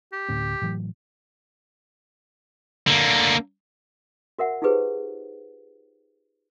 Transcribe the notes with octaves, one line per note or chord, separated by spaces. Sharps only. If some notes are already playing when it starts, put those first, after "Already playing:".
G4
D2 A2 C#4
A2 E3 F#3
D3 A#3
F#4 A#4 E5 F#5
D#4 F4 G4 G#4 B4 C5